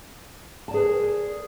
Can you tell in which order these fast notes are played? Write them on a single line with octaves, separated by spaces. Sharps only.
A5 D5 G#4 B4 A#4